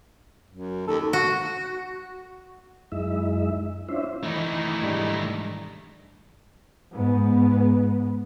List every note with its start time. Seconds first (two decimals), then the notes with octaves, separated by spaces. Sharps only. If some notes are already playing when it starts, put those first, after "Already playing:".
0.51 F#2
0.88 D#2 A4
1.13 F#4
2.92 F#2 G#3 D#4 E4 E5
3.89 C#4 D4 E4 F4 C5 E5
4.23 D#3 E3 A3 D#4
4.82 G#2 G3 D4
6.92 G#2 B3